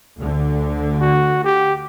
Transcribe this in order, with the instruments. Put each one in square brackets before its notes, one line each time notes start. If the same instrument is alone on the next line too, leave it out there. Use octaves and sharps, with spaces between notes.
[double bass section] D2 D3
[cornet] F#4
G4